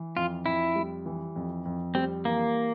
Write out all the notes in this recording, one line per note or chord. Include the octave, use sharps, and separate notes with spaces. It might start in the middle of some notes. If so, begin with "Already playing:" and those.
Already playing: E3
F2 F4
F2 E4
G3
E3
F2
F2
G3 C4
E3 A#3